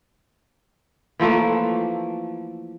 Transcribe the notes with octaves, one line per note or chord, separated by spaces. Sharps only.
E3 F3 A3 A#3